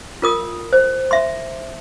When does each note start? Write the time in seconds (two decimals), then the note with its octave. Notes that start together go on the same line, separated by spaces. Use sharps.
0.22 F4 A#4 D#6
0.73 C5
1.11 E5 C6